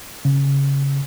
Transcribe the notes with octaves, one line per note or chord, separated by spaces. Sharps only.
C#3